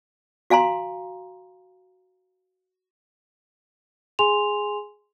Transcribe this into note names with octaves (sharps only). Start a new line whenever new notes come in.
F#4 F5 G#5 A#5 C6
G#4 G#5 C6 F7